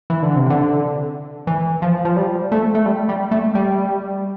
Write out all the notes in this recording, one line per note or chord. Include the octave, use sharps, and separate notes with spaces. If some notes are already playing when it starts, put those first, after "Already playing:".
E3
D3
C3
D3
E3
F3
F3
G3
A3
A3
G3
G3
A3
G3